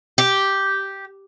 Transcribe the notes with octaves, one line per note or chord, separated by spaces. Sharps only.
G4